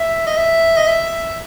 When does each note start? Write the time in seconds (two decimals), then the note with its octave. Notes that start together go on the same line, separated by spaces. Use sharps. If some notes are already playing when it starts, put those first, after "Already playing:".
Already playing: E5
0.27 D#5
0.37 E5
0.77 D#5
0.87 E5